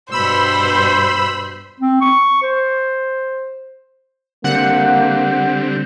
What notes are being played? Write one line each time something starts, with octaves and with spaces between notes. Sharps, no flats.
G2 B2 C5 B5 E6
C4
C#6
C5
D3 G3 A#3 C4 F#5